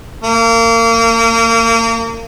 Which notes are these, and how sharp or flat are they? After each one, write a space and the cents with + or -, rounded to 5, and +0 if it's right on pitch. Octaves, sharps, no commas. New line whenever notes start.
A#3 -30